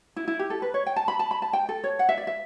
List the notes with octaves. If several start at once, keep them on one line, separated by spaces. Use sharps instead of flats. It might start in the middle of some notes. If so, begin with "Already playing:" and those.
E4
E4
G4
A4
B4
C#5
G5
A5
B5
A5
B5
A5
G5
A4
C#5
F#5
E5
D5
E5